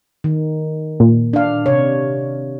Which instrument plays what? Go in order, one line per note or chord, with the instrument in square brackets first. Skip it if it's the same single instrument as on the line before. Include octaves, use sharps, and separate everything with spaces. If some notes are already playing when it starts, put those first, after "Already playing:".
[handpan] D#3
[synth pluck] A#2
[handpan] D4 F5
C3 C#5